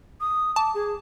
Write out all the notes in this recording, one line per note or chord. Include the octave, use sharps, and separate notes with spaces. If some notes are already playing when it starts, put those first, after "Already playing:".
D#6
A5 D6
G#4